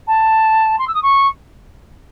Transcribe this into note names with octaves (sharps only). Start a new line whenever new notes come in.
A5
C6
E6
D#6
C#6